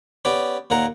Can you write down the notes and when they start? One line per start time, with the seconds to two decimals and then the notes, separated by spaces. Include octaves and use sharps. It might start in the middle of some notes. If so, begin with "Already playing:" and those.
0.25 B3 C#4 G4 D5
0.70 D#2 A#2 A#4 F#5 A#5